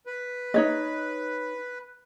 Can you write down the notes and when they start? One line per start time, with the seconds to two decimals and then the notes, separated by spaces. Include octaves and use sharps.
0.06 B4
0.54 D#4 C#5 D#5